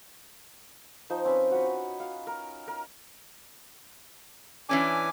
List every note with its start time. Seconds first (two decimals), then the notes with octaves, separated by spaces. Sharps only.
1.10 F3 D#4 C5
1.24 C4 C#4 B4
1.51 F#4 B4
2.00 F5
2.27 A#4
2.68 A#4
4.69 E3 C#4 D4 G#5 D6